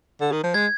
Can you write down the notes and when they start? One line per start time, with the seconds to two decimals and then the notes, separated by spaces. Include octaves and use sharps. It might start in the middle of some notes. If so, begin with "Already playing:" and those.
0.21 D3
0.32 D#3
0.43 F3
0.54 G#3 G#6